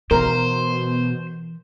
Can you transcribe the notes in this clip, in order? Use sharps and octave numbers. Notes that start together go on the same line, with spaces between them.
B2 E3 A#4 C5